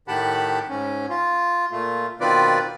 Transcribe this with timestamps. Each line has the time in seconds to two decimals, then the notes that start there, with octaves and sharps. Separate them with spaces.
0.08 A2 D#3 G4 F#5 A5 B5
0.69 G#2 C#4
1.09 F4
1.72 A#2 A3 F4
2.20 B2 D#3 C4 F4 B4 D5